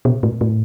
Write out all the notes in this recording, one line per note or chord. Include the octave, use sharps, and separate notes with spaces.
B2
A2
A2